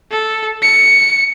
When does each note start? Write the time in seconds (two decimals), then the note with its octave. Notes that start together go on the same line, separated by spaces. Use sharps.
0.11 A4
0.62 C#7